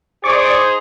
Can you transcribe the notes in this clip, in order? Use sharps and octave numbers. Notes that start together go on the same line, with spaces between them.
D#4 G#4 C5 D5 C#6 D6